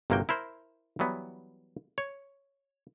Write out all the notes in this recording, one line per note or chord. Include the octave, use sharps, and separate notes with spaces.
G1 C3 A#3 F#4 G5
E4 A#4 C5
E3 F#3 G3 B3
C#5